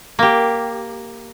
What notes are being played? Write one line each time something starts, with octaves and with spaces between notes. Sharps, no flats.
A#3 G4